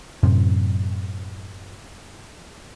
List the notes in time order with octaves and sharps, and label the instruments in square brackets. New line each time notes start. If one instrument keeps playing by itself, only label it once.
[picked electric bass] F#2 A2 C3